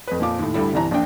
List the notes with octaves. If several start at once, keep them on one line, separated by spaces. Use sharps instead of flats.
F2 B4
F2 A#2 F3 D6
D#2 A2
D2 G2 G3 A3 E4
G1 C2 E3 A#5
A#1 A#2 D4 G5